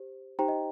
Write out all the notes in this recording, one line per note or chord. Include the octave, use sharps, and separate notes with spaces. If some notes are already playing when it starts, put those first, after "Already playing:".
Already playing: G4 C5
D#4 G4 C5 G5 A#5
D#5